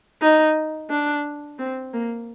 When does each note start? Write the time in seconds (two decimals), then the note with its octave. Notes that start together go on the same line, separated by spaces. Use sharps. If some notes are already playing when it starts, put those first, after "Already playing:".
0.22 D#4
0.90 D4
1.59 C4
1.93 A#3